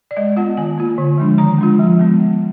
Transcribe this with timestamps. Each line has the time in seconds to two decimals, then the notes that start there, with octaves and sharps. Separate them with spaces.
0.11 D5
0.17 G#3 D#5
0.37 B3 F4 F#5
0.57 D#3 G#5
0.78 A#3 F4
0.98 D3
1.18 F3 G#3 D4
1.38 D#3 A#5
1.58 G#3 D4 F4
1.79 F3
1.99 G#3 B3
2.19 G#3